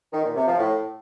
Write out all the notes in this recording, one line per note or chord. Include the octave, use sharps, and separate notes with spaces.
D#3
A#2
C3
F3
A2